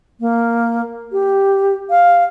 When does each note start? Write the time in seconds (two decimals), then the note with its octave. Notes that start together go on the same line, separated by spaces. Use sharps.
0.20 A#3
1.12 G4
1.90 F5